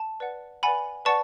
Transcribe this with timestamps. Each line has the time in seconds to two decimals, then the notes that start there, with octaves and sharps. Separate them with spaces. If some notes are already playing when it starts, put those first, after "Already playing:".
Already playing: A5
0.20 B4 D5 F#5
0.63 B4 D5 F#5 G#5 B5
1.05 B4 D5 F#5 A5 C#6